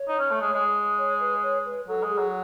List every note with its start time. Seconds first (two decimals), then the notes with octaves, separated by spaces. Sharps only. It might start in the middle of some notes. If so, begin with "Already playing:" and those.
Already playing: C#5
0.08 D#4
0.19 C#4
0.31 A3
0.42 G#3
0.53 G#3
0.98 C#5
1.20 B4
1.43 C#5
1.66 B4
1.88 F#3 A4
2.03 G#3
2.10 G#4
2.18 F#3